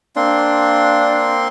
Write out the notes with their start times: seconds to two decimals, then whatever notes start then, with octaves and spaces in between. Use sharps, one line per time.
0.16 A#3 C4 D4 C6